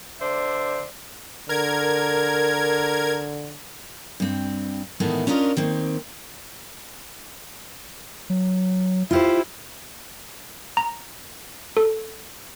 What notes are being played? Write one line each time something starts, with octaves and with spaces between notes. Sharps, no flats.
D3 C5 D5 E5
D3 A#4 G#6
G2 C4
E2 A2 D#3 G#3 A3 B3
C#4 D4 F4 A#4 D#5
D#3 A#3 C4
F#3
E4 F4 G4 C5
A#5
A4